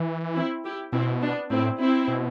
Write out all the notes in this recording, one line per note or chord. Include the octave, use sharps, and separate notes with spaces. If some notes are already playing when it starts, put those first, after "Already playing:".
Already playing: E3
C4 E4
E4 G4
B2 C4 E4
B3 D4
A2 C4 E4
C4 E4
B2